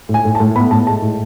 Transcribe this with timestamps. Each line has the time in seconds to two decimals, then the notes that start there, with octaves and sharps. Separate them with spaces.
0.09 A2
0.14 G#5
0.25 A2
0.35 A5
0.40 A2
0.56 B3 B5
0.71 A2 A5
0.87 G#3 A5
1.02 A2